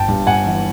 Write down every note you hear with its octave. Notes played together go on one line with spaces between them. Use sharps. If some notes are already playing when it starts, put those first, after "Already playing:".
Already playing: G1 G5 A5
G2
G1 F#5 G#5
E3